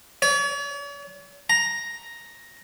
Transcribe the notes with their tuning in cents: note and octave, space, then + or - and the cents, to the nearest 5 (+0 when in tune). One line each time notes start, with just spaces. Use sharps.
C#5 +45
A#5 +5